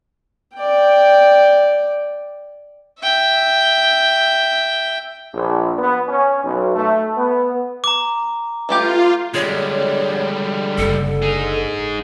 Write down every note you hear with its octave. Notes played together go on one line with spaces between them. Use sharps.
D5 G5
E5 G5
A#1
B3
C#4
B1
A3
B3
A#5 D6
E3 A3 F4 G4
D3 G3 G#3 C#5
F#1 C#3 A4
D#4 G#4